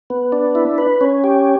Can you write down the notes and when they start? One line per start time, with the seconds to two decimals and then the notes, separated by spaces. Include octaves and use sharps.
0.10 B3
0.32 D4
0.55 E4
0.78 B4
1.01 C#4
1.24 G4